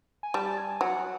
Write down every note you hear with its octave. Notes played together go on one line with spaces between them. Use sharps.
G#5
G3 A5
G#5
F#3 F#5